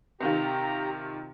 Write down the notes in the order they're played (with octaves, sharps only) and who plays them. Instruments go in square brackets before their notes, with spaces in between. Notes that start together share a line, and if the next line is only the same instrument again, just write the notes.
[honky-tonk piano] C3 D#3 F4 [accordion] G4 A#5